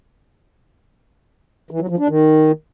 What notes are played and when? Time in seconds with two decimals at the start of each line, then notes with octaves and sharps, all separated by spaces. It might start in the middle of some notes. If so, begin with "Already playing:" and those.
1.71 E3
1.80 F#3
1.89 F3
1.99 D4
2.08 D#3